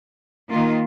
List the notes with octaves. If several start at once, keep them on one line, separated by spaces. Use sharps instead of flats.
D#3 A#3 F4